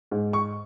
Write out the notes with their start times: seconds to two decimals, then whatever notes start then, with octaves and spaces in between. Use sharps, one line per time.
0.11 G#2
0.33 C#6